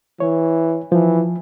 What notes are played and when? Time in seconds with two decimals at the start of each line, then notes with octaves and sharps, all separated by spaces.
0.20 E3 C#5
0.92 E3 F3